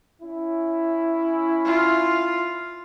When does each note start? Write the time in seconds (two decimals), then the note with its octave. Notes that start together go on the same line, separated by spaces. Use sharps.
0.22 C#4 E4
1.65 F4